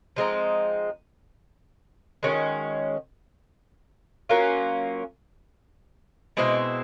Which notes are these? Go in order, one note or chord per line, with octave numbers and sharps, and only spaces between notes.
F3 G#3 C4 D#4
D#3 G#3 C#4 F#4
F#3 A#3 C#4 F4
B2 G#3 C4 E4